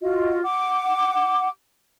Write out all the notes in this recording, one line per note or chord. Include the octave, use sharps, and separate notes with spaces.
F4 F#4 D#5
F#5 D6